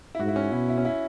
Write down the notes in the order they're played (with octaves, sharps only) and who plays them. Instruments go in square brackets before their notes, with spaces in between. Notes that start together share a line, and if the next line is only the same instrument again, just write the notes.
[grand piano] E4
[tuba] G#2 [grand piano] F#4
[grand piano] E4
C#4
[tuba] B2 [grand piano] E4
[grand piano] E4
C#4
E4